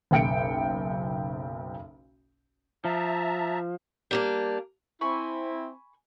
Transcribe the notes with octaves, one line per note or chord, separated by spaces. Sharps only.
F#1 B1 G5 C#7 D7
F3 E5 A5 A#5
G3 A#3 D4
C4 E4 G#5 B5 C#6